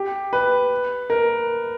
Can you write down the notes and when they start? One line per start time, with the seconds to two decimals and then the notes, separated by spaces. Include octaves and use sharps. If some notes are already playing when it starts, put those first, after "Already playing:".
Already playing: G4
0.33 B4
1.10 A#4